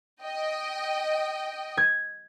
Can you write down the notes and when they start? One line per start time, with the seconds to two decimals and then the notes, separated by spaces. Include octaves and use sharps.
0.23 D#5 G5
1.77 G#6